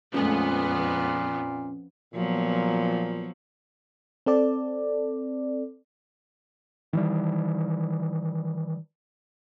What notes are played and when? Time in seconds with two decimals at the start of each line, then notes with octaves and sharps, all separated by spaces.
0.14 F2 A#2 F3 G#3 A3 B3 C#4
2.14 A#2 F3 F#3 B3
4.26 C4 A4 D5
6.93 D#3 E3 G3